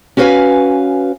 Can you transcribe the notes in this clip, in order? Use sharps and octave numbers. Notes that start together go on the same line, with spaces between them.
C#4 F#4 B4 C5 F5 G#5